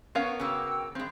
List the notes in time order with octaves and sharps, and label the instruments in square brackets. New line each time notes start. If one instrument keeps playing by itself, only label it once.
[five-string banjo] B3 C#4 F5 [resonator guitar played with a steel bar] A#4 [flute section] F#5 C#6
[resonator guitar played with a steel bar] C#3 A#3 [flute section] F#4 G5 E6
[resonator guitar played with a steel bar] G2 G#3 [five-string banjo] C4